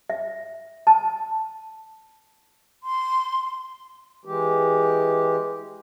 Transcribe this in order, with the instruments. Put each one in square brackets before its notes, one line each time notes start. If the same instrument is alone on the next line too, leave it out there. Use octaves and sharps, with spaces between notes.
[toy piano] E5
A5
[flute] C6
[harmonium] E3 G#3 G4